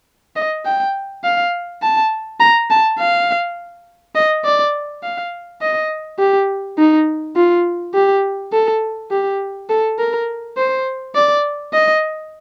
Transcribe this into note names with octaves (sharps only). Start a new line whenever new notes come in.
D#5
G5
F5
A5
A#5
A5
F5
D#5
D5
F5
D#5
G4
D#4
F4
G4
A4
G4
A4
A#4
C5
D5
D#5